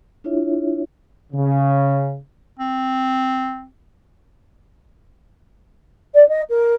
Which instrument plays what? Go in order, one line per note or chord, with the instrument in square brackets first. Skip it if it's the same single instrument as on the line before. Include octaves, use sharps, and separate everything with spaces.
[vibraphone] D4 E4 F4 C#5 E5
[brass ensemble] C#3
[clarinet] C4
[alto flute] D5
D#5
A#4